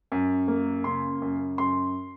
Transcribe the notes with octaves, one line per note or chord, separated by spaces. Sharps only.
F#2
A#3
C#3 C6
F#2
F#2 C6